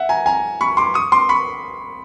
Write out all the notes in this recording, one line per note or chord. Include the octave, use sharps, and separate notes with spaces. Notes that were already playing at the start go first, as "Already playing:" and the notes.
Already playing: E5 F#5
G#5 A#5
G#5 A#5
B5 C#6
C6 D6
C#6 D#6
C6 D6
B5 C#6